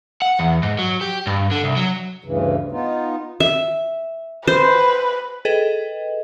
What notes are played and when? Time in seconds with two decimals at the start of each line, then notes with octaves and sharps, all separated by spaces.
0.22 F#5
0.39 E2
0.63 G#2
0.79 F#3
1.01 G4
1.27 G2
1.51 D3
1.64 C2
1.77 F#3
2.24 D2 G2 C#3 E3
2.72 B3 D#4 F4
3.40 E5
4.47 B4 C5
5.45 G#4 A4 B4 D#5 G5